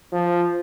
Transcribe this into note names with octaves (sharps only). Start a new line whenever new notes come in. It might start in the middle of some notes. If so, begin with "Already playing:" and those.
F3